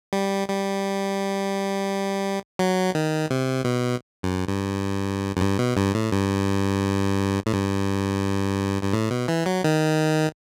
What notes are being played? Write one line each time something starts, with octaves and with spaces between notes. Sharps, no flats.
G3
G3
F#3
D#3
C3
B2
F#2
G2
F#2
G2
B2
G2
A2
G2
A2
G2
G2
A2
B2
E3
F#3
D#3